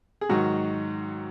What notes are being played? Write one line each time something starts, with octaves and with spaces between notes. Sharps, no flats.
G#4
G#2 D#3 F#3 F#4